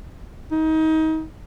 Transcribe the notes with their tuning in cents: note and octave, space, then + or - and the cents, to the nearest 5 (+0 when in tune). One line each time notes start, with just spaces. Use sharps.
D#4 +30